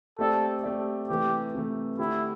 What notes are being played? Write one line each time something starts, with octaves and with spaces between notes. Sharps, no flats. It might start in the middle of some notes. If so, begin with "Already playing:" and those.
A3 C4 G4 A4 D5
A3 C4 G4 D5
C3 E3 A3 G4
C3 E3 A3
D3 A3 D4 E4 G4